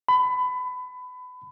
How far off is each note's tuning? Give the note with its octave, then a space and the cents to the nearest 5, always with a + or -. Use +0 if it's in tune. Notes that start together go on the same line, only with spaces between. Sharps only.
B5 +25